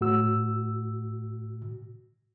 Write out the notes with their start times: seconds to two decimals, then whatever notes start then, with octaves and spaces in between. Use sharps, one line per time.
0.01 A2 F#4 E6